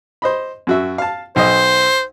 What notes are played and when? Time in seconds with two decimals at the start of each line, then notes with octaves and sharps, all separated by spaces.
0.22 C5 D#5 B5
0.67 F#2 F#4 E5
0.98 F5 A5
1.36 B1 C5 D#5